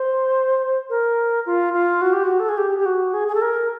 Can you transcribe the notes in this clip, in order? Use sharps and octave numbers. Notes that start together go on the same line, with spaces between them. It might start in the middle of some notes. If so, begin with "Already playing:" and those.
Already playing: C5
A#4
F4
F4
F#4
G4
F#4
A4
G#4
G4
G4
F#4
G#4
G#4
A4
A#4